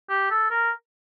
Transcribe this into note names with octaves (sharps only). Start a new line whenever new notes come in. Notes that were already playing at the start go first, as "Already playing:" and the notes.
G4
A4
A#4